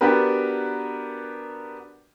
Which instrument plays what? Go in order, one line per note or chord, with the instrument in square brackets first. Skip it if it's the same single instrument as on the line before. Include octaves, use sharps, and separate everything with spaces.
[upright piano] B3 D4 F#4 G4 A#4 B4